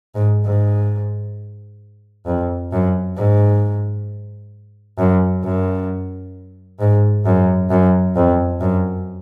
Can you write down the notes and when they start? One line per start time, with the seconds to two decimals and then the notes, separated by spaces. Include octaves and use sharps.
0.15 G#2
0.45 G#2
2.26 F2
2.72 F#2
3.18 G#2
4.98 F#2
5.44 F#2
6.80 G#2
7.26 F#2
7.70 F#2
8.16 F2
8.61 F#2